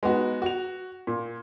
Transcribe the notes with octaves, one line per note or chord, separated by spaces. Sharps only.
G#3 B3 D#4 F#4
F#4 F7
A#2